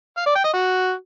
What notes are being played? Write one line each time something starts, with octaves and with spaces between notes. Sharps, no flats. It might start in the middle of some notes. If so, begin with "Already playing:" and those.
F5
D5
G5
D#5
F#4